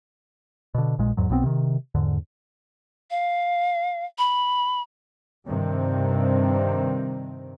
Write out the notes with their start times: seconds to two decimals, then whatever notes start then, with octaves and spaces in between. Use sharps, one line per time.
0.75 B2 D3
0.98 A#1 A#2 G#3
1.17 E2 G#2 F#3
1.30 B1 B2 B3 C4
1.44 C3 D#3
1.95 E2 G#2 D3
3.11 F5
4.18 B5
5.46 G2 C3 D#3 C4